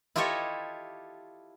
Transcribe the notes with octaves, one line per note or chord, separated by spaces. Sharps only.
E4 F4 G4 A4 C#5 D#5